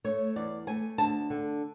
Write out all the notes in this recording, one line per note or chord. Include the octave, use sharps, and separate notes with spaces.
A3 C#5
E2 D5
A3 G#5
D2 A5
D3